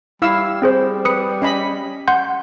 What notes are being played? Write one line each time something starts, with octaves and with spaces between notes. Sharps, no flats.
G3 E4 F5 E6
C4 G#4 C5
B4 D#6 C#7
C#4 D#5 B5
F#5 C6 G6